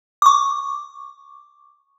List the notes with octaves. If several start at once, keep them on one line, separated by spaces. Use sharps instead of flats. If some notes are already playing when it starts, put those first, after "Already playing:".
C#6 D6